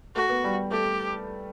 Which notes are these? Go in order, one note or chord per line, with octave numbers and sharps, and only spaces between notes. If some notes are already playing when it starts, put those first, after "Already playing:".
A3 F#4
B3
G3
A3 G4